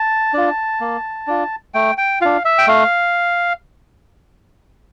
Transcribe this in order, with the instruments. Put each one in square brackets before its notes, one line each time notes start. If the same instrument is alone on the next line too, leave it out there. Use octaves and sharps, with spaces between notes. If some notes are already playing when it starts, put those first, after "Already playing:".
Already playing: [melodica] A5
D4 F4
A#3
D4 F4
A3 G5
G5
D4 F4 F5
E5
G5
A3 F5